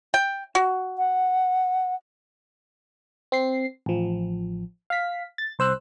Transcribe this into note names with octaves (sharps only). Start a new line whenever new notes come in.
G5
F#4
F#5
C4 C7
A1 F3
F5 B6
A6
C2 C5 E6 F#6